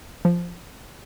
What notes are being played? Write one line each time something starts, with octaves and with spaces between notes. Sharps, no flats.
F3